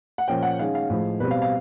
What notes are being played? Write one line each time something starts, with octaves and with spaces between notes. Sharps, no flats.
F#5
A#2 F3 A#3 C#4 G5
F#5
D#3 G#3 C#4 F5
F5
A2 F3 G#3
B2 G3 C4 B4
F5
F5